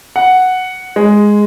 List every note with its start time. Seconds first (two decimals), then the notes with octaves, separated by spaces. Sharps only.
0.16 F#5
0.96 G#3